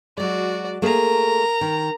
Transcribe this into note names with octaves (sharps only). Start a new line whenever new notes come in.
F#3 G#3 F#4 D5
A3 A#3 G#4 A#4 A#5
D#3